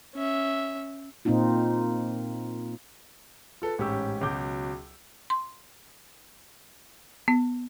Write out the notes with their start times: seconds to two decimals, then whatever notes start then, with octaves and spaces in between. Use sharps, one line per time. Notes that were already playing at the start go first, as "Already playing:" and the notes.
0.15 C#4 E5
1.25 A#2 A#3 C4 D#4 F4
3.62 F4 A4 B4
3.78 A1 G#2 C#4 G4 C#6 E6
4.21 C#2 B2 F#3 F#4 D6 G6
5.30 C6
7.28 B3